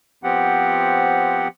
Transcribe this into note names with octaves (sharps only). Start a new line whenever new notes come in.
F3 B3 C4 G4 F#5